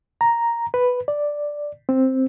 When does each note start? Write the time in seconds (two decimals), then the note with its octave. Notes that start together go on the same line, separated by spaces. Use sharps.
0.21 A#5
0.74 B4
1.08 D5
1.89 C4